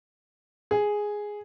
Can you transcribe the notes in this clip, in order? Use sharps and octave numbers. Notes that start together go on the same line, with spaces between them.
G#4